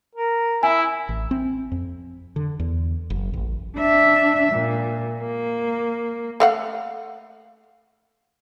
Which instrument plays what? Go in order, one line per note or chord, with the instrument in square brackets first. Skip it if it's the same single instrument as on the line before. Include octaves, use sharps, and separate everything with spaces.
[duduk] A#4
[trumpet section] E4 [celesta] G#5
[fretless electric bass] A1
C4
F2
D3
E2
F#1
A1
[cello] D4 E5
A#2
A#3
[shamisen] A3 F5 F#5